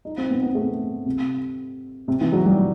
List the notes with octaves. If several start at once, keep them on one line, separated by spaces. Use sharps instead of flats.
D#4
C4
B3
B3
A3
C3
C3
E3
F#3
G3